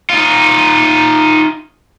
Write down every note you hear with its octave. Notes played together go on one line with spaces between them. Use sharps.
D#4 F4